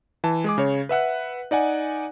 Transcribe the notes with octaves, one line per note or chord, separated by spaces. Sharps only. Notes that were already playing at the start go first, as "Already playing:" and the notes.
E3 A5
G#3 G#4 D6
C#3 C#5
B4 E5 F#5 F#6
D#4 D5 F#5 G#5